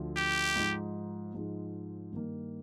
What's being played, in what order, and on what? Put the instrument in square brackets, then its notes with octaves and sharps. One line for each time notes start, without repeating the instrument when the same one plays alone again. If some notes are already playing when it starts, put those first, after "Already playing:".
Already playing: [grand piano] D2 D3 F3
[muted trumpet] G4
[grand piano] G#2 F3 G#3 D#4
G#2 F3 G#3 D#4
G2 D#3 A#3